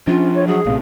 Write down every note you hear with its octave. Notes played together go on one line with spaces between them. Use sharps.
F3 C#4 D4 F4
C#5
F#3 G#4
A#1 A2 C3 F5